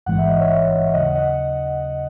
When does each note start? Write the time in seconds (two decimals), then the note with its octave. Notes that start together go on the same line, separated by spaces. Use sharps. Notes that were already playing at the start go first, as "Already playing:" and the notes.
0.06 A1 G#2 E3 G#3 F#5
0.18 E5
0.29 D#5
0.41 C#5 E5
0.93 D#2 C#3 F#3 D#5 F#5
1.15 D#5 F#5